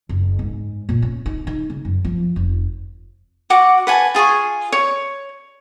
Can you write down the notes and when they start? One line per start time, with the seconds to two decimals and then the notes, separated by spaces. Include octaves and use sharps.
0.09 F#1
0.39 G#2
0.89 A#2
1.02 C#4
1.26 D#4
1.47 D#4
1.70 C#3
1.85 F#2
2.05 F3
2.36 F1
3.50 F#4 F#5 D6
3.87 B4 F#5 G#5 A5
4.15 F4 G#4 G#5 C#6
4.72 C#5